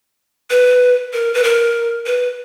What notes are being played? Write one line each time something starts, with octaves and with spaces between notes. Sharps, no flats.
B4
A#4
B4
A#4
B4